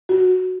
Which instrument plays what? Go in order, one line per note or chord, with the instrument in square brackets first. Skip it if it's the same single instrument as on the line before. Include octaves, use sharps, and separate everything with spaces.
[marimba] F#4